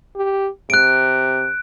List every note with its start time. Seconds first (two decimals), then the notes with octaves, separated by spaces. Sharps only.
0.16 G4
0.70 C3 F#6 D7